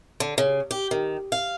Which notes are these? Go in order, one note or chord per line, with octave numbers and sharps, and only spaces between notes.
D3
C#3
G4
D#3
F5